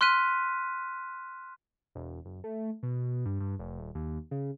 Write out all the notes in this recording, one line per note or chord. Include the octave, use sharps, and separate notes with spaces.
C6 F6 F#6 B6 D#7
E1
F#1
A3
B2
G2
G2
F1
D#1
D#2
C#3